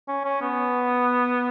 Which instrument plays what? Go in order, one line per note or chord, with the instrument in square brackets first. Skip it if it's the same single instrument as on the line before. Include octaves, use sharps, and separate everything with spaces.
[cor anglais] C#4
C#4
B3